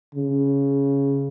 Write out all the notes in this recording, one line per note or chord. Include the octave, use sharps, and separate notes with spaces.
C#3